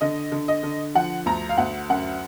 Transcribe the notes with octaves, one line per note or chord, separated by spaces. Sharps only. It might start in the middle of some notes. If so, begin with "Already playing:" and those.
D3 D#5
D3
D#5
D3
F3 F#5
D2 A#5
F5
D2 F#5
F#2 F#5